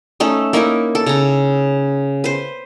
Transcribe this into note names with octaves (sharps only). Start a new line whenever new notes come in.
A3 C#4 D#4
A#3 D#4 E4 A#4
A4
C#3 A#5
B4 C5